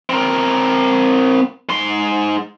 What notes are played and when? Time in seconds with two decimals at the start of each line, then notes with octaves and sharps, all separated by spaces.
0.10 C4 A#4
1.69 G#2 C6